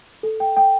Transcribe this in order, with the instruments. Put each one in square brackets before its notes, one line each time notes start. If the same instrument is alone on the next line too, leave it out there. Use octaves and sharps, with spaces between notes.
[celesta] A4
G5
G5